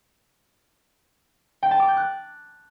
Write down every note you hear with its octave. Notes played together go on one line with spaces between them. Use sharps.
G5
A5
D6
G6
F#6